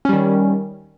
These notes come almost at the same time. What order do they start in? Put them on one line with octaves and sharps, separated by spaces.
C#4 G3 D#3